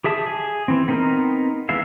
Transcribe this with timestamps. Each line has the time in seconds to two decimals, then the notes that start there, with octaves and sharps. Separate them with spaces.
0.04 G4 G#4 E5 A5 D#6
0.26 G#4
0.68 E3 C4
0.88 B3 C4 D#4 A#4
1.69 E3 G#3 B3 E5 F5